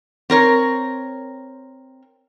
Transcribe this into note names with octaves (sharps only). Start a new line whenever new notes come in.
C4 A#4 C#5